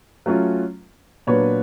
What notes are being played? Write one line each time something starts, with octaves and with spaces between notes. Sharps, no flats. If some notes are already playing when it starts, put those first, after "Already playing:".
F#3 A3 C#4 F4
A#2 F#3 B3 D4 B4 C#5